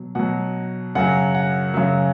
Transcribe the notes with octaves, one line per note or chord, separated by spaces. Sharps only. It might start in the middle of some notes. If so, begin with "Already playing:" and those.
Already playing: B2 F#3
B2 F#3 F#5
F#2 C#3 F#3 F#5
F#5
F#2 C#3 F#3